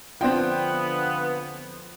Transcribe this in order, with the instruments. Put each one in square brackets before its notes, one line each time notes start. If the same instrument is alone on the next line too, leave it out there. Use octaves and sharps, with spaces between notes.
[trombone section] D3 F3 [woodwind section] B3 [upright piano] C4 D4 F4 [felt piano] G5